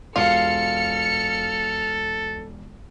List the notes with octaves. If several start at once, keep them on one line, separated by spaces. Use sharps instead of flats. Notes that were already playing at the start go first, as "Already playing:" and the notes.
E1 F4 A4 F5 F6 C#7